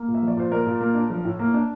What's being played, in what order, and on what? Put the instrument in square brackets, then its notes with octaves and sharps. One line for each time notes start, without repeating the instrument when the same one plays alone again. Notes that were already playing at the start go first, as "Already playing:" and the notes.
Already playing: [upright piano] A#3
A#2
E5
F3
D5
A#2 C5
A#3 A#4 D5
A#2
A#3
D4
F3
A2
A#3
D4